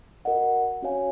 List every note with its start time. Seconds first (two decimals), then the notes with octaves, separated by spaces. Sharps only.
0.25 F#4 A#4 D#5 F#5
0.82 C#4 F#4 C#5 F5 G#5